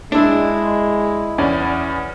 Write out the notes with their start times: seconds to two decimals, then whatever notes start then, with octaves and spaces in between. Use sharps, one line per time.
0.12 G#3 D4 E4
1.38 E2 C#4 D5